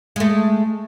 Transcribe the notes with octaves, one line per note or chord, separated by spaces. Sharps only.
G#3 A3